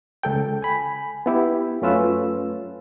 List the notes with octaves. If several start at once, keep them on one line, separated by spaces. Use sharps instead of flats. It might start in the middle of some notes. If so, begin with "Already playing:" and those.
C#2 A4 G5
G#5 B5
B3 E4 G4
F#2 A3 C#4 F4 B4 E6